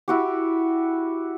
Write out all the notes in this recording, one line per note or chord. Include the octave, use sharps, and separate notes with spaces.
E4 F#4 G4